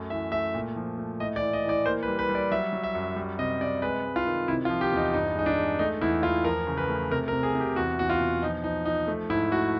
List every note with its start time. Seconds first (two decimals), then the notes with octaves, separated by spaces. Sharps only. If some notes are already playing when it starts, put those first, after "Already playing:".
Already playing: F#2 A3
0.10 E3 E5
0.32 A3 E5
0.54 A#2
0.76 F3
0.98 A3
1.20 A2 D#5
1.36 D5
1.41 E3
1.53 D#5
1.64 E3 D5
1.86 A#3 C5
2.03 B4
2.08 G3
2.19 B4
2.29 G3
2.35 D5
2.51 F#3 E5
2.73 F#3
2.83 E5
2.95 F#2
3.16 G3
3.39 C3 D#5
3.61 C3 D5
3.82 G#3 B4
4.05 G#3
4.16 F4
4.26 D#3
4.48 C3 E4
4.65 F4
4.69 F3
4.81 G4
4.92 E2 D#4
5.13 G2 D#4
5.35 G#3 D#4
5.46 D4
5.58 G#3
5.79 A3 D#4
6.01 E2 E4
6.23 E2 F4
6.45 F3 A#4
6.67 C#3
6.77 B4
6.89 A3
7.11 C3 A#4
7.28 A#4
7.33 C3
7.43 G#4
7.55 C3
7.60 G4
7.76 E2 F#4
7.99 E2 F#4
8.10 F4
8.20 B2
8.42 F3 D#4
8.64 F3 D#4
8.85 F3 D#4
9.08 A3
9.30 G#2 E4
9.51 A3 F#4